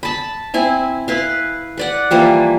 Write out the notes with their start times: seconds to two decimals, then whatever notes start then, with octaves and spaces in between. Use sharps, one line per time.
0.03 A5 B5
0.54 C4 E4 G#5
1.08 E4 B4 F5
1.78 B4 D5 F#5
2.11 E3 F3 G3 A#3